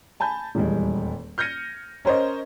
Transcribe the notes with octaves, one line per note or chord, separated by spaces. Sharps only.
G#5 A5 B5 G6
D#1 E2 G3 G#3
F6 G6 G#6 A#6 C#7 D#7
C#4 A#4 C5 C#5 D#5